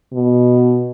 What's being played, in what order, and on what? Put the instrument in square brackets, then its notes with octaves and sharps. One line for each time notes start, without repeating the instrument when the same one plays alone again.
[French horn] B2